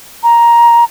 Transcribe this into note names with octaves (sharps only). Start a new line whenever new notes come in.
A#5